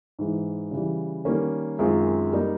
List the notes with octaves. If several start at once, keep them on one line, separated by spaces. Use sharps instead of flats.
G#2 E3 G#3
C#3 E3 G3
D#3 G3 A#3 C#4
F#2 D#3 G#3 C4 F4
G3 A#3 D#4